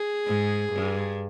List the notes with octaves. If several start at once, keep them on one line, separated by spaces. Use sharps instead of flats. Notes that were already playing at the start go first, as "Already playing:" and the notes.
Already playing: G#4
G#2
G2